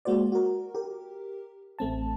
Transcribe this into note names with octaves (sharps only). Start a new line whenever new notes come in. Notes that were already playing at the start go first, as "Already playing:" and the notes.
G#3 A#3 F#4 C5 D5
F#4 A#4
G4 A#4
A1 A3 C4 A5